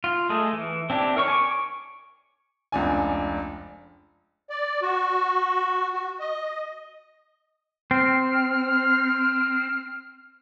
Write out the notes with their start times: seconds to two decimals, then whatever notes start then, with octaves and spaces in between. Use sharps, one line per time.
0.04 F4
0.29 G#3 A3 G#4
0.53 E3
0.90 C4 D4 E4 G4
1.17 A#4 C#5 C#6
1.28 G#5 C#6 D6
2.72 F1 C#2 D4 G#5
4.50 D5
4.82 F#4
5.93 F#4
6.20 D#5
7.91 C4 F6